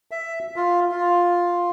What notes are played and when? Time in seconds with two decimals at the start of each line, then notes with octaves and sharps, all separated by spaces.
0.11 E5
0.56 F4
0.91 F4